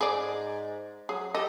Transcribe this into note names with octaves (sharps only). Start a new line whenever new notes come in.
G#2 G#4 D5
F#3 G#4
G4 A4 D#5